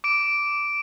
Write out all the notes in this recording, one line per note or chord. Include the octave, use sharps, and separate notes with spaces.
D6 D7